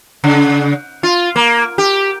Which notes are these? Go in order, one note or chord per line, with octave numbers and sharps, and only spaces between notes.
C#3
F4
A#3
G4